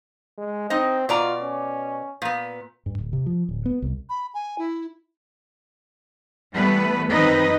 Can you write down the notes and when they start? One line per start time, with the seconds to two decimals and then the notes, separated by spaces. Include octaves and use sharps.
0.38 G#3
0.70 C4 D#4 D#5
1.09 B2 F4 D5 A#5
1.42 C#4
2.22 A#2 B3
2.86 G2
2.99 D1
3.13 C3
3.26 F3
3.49 D1
3.66 B3
3.82 C2
4.09 B5
4.34 G#5
4.59 E4
6.53 E3 G3 A3 B3 B4
7.10 F#2 D#3 C4 D#4 B4 D#5